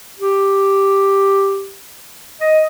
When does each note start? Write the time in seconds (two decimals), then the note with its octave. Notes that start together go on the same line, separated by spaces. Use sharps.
0.19 G4
2.41 D#5